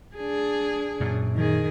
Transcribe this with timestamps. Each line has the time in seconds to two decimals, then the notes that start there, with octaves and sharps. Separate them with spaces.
0.16 D4 G#4
1.00 F#2 A#2
1.35 D#3 G#4